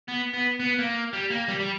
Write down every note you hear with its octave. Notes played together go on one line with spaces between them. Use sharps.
B3
B3
B3
A#3
G3
A#3
G3
G3